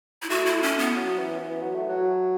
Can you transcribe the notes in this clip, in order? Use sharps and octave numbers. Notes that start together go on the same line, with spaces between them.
E4
A3 F#4
E4
C#4
B3
F#3
E3
E3
F#3
A3
F#3